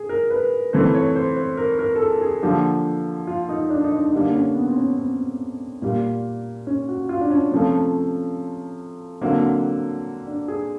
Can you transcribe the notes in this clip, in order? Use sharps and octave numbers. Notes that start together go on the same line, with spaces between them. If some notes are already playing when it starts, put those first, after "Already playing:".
Already playing: G#4
A#4
B4
C3 E3 A3 C5
C#5
C5
C5
A#4
A#4
A4
G#4
G#4
D3 F3 A#3 G4
F4
D#4
D4
D#4
D4
D#4
D3 G3 A#3 D4
C#4
B3
C4
C#4
C4
A#2 G3 A#3
C#4
F#4
F4
D4
C#4
C3 F3 A3 C#4
D3 F#3 A#3 C4
D4
G#4